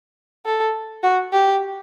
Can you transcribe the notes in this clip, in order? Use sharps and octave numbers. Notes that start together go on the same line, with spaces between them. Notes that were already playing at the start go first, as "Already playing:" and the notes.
A4
F#4
G4